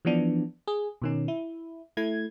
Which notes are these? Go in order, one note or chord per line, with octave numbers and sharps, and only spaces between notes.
E3 F3 B3 D4
G#4
B2 D#3 C#4
E4
A3 E4 G#6